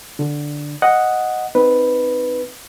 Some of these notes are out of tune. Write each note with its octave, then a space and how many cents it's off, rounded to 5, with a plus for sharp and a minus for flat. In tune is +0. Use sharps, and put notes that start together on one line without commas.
D3 +0 D4 +0
D#5 +0 F#5 +0
C4 -15 D#4 +0 B4 +0